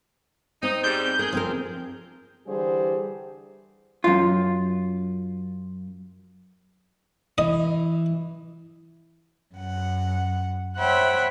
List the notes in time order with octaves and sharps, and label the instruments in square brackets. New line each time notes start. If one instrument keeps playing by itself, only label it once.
[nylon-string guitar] C4 [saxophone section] D#4
[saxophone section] G#2 G3 [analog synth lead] G6
[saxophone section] G#4 [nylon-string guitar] A#4
[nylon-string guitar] F3 C4 A#4
[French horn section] D3 E3 G3 G#4 C5
[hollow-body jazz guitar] F#2 F4
[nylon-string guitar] E3 [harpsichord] D#5
[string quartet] F#2 F#5
C5 C#5 E5 F#5 G5 B5